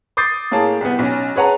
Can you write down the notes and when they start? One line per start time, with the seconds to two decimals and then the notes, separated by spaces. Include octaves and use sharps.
0.17 D6 D#6 G6 A6 C7
0.52 A2 A#3 G#4 C#5 A5
0.81 C2 B3
0.99 B1 C#4
1.36 G#4 B4 C#5 F#5 A5 A#5